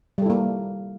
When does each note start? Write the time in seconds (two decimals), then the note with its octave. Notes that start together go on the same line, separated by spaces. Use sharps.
0.18 G3
0.22 A4
0.26 E4
0.30 A#3